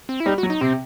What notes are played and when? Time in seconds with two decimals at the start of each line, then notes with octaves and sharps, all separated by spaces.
0.09 C4
0.20 E4
0.26 G3 D#4
0.38 F#4
0.43 F#3
0.50 D#4
0.61 C3 C4